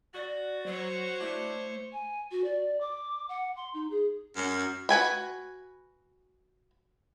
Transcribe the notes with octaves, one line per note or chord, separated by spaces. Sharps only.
F#4 D5
F#3 C5 C#5
A3 D4 E4
G#5
F#4
D5
D6
F#5
C6
D#4
G#4
F#2
F#4 B4 G#5 B5